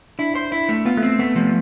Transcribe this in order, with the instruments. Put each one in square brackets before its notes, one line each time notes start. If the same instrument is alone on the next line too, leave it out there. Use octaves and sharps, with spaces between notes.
[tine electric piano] D4 [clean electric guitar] E4
[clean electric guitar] C5
E4
A3
[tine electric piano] B3 [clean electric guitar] F4
[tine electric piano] A3
[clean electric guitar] C4
[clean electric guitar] A3 [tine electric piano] B3
[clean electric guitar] F3